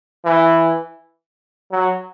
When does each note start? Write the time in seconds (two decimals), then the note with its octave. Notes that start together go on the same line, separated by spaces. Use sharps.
0.25 E3
1.72 F#3